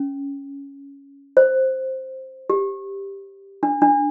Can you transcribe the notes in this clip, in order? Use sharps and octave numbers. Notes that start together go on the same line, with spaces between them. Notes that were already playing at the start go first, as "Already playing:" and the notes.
Already playing: C#4
C5
G4
D4
D4